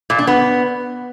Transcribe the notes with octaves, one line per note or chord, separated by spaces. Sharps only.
A#2
D4
B3